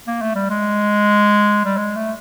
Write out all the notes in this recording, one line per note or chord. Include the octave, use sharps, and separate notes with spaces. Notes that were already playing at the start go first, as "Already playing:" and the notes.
A#3
A3
G3
G#3
G3
G#3
A3